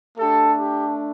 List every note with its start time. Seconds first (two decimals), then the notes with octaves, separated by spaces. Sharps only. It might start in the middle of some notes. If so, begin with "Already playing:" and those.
0.18 A3 D4 G4 A4
0.54 G4